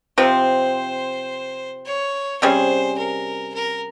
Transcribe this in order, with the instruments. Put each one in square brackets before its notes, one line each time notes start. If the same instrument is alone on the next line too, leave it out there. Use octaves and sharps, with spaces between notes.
[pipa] C3 F3 C4 [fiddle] C5
[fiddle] C#5
[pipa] C3 G3 C#4 G#4 [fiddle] C5
[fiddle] A#4
A#4